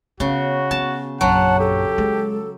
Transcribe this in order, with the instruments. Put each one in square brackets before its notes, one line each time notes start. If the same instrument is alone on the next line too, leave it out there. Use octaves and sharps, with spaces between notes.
[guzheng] C#3 [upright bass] B3 [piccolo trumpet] F#4
[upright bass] B3 [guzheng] A5
[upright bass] A#1 F#2 [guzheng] F#3 [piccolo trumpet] F#5 [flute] A5
[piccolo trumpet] G4 [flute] A4
[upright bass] G#3